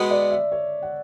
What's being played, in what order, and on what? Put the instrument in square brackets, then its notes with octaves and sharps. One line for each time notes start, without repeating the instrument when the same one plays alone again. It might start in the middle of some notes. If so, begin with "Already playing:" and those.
Already playing: [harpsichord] B2 G#3 B3 F#4 B4
[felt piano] D5
E5
C#5
F#5